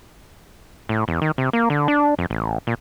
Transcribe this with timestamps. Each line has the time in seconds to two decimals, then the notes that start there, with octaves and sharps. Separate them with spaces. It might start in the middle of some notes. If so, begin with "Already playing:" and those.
0.89 A2
1.08 E2
1.22 D#3
1.38 C3
1.53 A#3
1.70 D3
1.88 D4
2.19 F2
2.30 A1
2.67 A#2